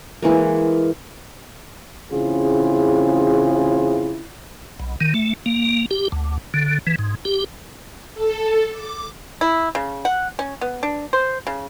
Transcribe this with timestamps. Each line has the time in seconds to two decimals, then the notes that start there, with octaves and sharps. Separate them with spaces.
0.22 E3 G#3 A#3
2.12 A1 C#3 C4 E4 F4 G#4
4.80 B1
5.01 D#3
5.14 A3
5.46 A#3
5.91 G4
6.12 D2
6.54 D3
6.87 E3
6.99 G#2
7.25 G4
8.14 A4
8.72 D6
9.41 E4
9.75 C#3
10.05 F#5
10.39 C#4
10.61 B3
10.83 D4
11.13 C5
11.47 C#3